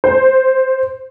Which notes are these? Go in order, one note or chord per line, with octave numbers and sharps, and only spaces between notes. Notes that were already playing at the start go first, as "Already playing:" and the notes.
C5